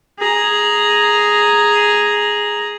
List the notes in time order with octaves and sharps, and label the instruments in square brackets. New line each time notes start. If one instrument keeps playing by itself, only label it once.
[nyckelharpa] G#4 A#5